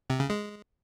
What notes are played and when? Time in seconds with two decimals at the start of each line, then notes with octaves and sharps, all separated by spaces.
0.10 C3
0.20 C#3
0.30 G#3